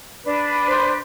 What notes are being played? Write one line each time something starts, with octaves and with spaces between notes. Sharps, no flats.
D4 B4
C5